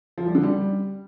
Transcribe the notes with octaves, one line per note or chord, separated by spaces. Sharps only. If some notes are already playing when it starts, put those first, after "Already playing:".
F3
G3
D3
G3